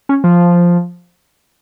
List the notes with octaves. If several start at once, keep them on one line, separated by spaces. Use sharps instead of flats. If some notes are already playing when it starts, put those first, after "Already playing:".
C#4
F3